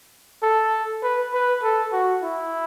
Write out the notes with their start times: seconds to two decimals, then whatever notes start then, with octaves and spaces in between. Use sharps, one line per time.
0.43 A4
1.03 B4
1.33 B4
1.63 A4
1.92 F#4
2.22 E4